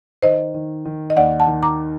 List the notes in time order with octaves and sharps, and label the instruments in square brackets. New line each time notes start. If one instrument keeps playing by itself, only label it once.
[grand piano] D#3 [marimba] C5 D#5
[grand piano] D#3
D#3
[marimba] D#5
[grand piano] D#2 [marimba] D5 F#5
[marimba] F#5 A5
[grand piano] D#3
[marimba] A#5 D6